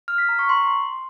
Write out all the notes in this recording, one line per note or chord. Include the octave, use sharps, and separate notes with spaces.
F6
B6
A#5
C#6
C6